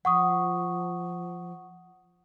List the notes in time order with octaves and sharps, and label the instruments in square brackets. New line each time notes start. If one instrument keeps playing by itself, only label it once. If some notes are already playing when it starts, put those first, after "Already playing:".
[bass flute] F3 [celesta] F#5 C#6 D#6